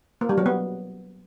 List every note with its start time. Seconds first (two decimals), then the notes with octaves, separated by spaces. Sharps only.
0.21 A#3
0.29 G3
0.38 F#3
0.46 B3